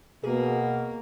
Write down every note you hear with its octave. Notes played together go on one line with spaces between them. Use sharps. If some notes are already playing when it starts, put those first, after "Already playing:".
B2 A#3 G#4 A#4